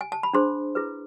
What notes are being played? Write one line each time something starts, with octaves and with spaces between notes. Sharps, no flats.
G#5
A5
B5
D4 G#4 C5 C6
E4 G#4 B4